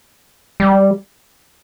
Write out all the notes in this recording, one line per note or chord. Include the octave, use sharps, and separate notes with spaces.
G3